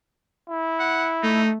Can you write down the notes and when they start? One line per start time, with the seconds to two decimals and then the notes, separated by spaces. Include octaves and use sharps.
0.49 E4
0.80 F#5
1.23 A3 D#4